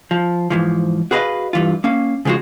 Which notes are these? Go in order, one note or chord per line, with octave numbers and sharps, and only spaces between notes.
F3
G#2 E3 F3
F#4 G#4 B4 C#5 D#5 F5
G2 E3 F4
A#3 C#4 F5
C#3 F3 G#3 F4 F#4